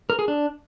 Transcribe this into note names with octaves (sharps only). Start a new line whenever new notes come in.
A#4
G#4
D4